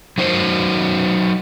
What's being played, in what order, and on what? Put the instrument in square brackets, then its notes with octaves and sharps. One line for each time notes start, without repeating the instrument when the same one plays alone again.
[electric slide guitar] F#3 D#4 F#4 C5